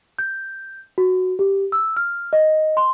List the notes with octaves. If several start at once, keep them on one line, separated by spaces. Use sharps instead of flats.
G6
F#4
G4
E6
F6
D#5
C6